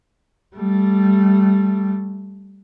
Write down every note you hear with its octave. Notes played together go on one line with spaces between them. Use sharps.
G3 A3